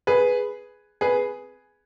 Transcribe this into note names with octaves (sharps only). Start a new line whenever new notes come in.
G#4 B4
G#4 B4